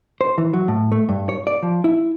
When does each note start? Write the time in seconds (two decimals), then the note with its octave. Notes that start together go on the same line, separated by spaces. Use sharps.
0.21 C5
0.38 E3
0.53 F#3
0.68 A2
0.92 A3
1.09 G2
1.29 C#5
1.47 D5
1.63 F3
1.84 E4